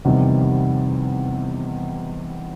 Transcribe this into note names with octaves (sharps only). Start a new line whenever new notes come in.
F1 E2 C3 D#3 G3